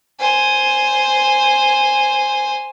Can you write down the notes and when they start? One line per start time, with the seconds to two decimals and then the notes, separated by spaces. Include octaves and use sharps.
0.19 C5 G#5